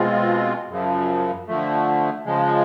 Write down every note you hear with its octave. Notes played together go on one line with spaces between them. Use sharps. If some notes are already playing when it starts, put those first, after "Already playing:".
Already playing: B2 G#3 C4 F4
F#2 C#3 F3
D3 F3 A3
C#3 F3 G#3